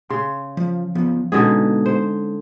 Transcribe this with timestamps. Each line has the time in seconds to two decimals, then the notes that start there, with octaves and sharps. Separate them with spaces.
0.10 C#3 C6
0.57 F3
0.95 F3 B3
1.32 B2 D3 G#3 C#4 D#4 G#4
1.86 C5